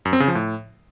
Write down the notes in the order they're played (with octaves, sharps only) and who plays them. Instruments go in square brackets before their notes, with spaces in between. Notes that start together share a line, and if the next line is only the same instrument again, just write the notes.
[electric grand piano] F#2
C4
C#3
F3
A2